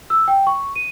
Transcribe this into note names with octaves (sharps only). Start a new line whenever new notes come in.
E6
G5
C#6
D#7